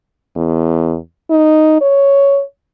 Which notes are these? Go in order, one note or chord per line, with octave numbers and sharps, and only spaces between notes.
E2
D#4
C#5